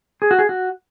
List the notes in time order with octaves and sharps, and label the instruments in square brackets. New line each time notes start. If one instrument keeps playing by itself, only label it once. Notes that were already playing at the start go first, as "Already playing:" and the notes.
[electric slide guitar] G#4
F#4
G#4
F#4